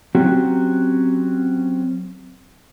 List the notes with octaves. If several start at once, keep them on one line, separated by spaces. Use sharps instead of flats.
F#3 C4 C#4 F#4 G4